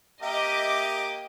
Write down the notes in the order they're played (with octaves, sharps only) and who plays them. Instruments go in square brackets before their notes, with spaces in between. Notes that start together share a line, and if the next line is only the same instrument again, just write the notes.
[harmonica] A#3 G4 A#4 [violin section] D#5 D6 [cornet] E5